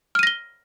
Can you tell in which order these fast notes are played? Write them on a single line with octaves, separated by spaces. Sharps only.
F6 D#7 A#6 G7